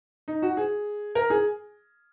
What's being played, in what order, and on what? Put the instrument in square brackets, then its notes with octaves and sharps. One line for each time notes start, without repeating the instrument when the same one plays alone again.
[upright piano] D#4
F#4
G#4
A#4
G#4